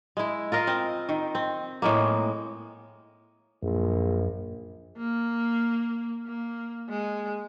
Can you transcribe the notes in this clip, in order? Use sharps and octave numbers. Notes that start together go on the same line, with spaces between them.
G#3 E4
F4 A#4 D#5 F5
C4
D#3
C4
A2 G#3 A#3
A#1 F#2
A#3
A#3
G#3